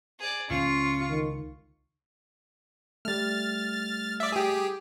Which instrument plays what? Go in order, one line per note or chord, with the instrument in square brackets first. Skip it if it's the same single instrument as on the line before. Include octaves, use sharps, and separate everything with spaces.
[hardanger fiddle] G#4 D5
[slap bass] C#2 F3 [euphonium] C#4 [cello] F4 [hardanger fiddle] C#6
[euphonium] D#3
[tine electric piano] G3 A3 [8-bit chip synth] F6 A6
[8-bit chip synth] D5 E5
G4 G#4